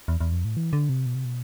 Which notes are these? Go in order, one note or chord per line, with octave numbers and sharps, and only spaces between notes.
E2
E2
F2
A2
E3
D3
C3
B2
C3
B2